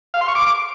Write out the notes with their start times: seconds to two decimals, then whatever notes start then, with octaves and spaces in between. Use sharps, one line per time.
0.14 F5
0.21 C6
0.28 C#6
0.35 D6